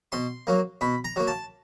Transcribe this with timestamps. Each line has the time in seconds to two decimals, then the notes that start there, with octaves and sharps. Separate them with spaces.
0.12 B2 C6
0.47 F#3 A#3
0.81 B2 B5
1.04 A#5
1.16 F#3 A#3
1.27 A5